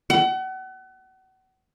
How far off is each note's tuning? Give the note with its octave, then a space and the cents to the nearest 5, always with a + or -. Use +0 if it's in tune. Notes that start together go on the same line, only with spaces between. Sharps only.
F#5 +35